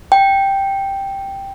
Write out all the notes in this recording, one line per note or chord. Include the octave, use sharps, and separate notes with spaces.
G5